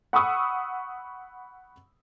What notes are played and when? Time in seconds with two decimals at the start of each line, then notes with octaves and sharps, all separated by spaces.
0.13 F#5 B5 C#6 D#6 E6